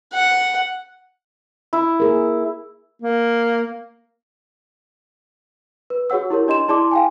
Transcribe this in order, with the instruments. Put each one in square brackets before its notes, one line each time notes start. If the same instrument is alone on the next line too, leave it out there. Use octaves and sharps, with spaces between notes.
[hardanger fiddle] F#5
[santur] E4
[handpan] A#3 G#4 A#4
[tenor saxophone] A#3
[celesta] B4
F#4 G#4 C#5 F#5 E6
E4 G4 A#4 C#5
D4 D#5 C6 E7
E4 G#4 D5 A5 C6 D6
F5 G5 G#5